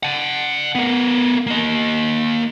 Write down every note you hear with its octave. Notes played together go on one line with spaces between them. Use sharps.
F#5 A5
B3 A#4
A#3 D#5